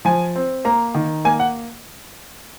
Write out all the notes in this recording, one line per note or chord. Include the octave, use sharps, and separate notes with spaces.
F3 G#5
C4
A#3 A#5
D#3
A#3 G#5
F#5